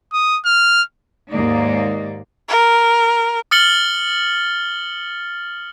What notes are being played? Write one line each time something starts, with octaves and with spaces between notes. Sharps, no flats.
D#6
F6
D#2 G#2 G#3 A#3 D#4 D5
A#4
D#6 F6 A6 C#7 F#7 G7